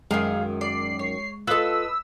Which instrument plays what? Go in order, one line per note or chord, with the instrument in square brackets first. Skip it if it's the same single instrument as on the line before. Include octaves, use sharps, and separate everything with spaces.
[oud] F#2 D#3 [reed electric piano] G#3 [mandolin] G#4 F5
[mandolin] D5 [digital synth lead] C7
[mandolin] C#5
[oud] F4 A4 [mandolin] B4 D#5 [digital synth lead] E6